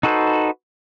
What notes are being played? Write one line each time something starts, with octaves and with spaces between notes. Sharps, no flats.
D#4 F#4 A4 B4 C5